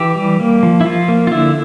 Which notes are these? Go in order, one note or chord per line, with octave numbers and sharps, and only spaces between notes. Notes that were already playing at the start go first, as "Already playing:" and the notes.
Already playing: E3 G4
G3
A#3
F3
E4
F3 F4
A#3
F4
D3 E4